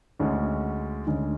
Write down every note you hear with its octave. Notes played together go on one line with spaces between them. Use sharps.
D2 D3 G#3 C#4
D2 D3 G#3 C#4